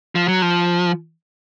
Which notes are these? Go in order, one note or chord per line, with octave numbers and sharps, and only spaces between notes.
F3
F#3
F3